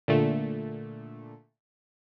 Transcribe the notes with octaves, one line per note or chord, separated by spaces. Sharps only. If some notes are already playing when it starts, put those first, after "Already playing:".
A#2 D3 A3